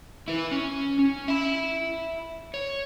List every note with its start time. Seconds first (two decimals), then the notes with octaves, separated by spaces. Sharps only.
0.28 E4 B4
0.51 C#4
0.99 C#4
1.28 E5 B5
2.54 C#5